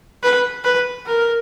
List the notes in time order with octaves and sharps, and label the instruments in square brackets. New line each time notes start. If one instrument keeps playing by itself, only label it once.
[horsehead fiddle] B4
B4
A#4